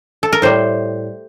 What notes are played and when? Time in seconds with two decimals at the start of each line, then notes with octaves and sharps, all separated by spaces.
0.23 A4
0.33 A#4
0.42 A2 G3 C5